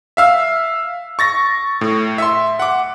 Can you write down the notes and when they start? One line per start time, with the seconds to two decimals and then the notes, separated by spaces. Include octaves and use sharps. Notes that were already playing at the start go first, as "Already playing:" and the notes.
0.17 E5 F5 E6
1.19 C#6 A6 A#6
1.81 A2
2.18 E5 C6
2.59 F#5 D6